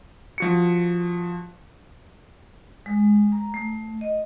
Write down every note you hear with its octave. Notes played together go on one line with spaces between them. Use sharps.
F3 F#4 C#7
G#3
A#5
A3
D#5